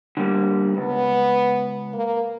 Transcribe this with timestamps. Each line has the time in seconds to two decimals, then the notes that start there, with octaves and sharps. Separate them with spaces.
0.17 D3 G3 A#3
0.77 C#2 B3
1.94 A#3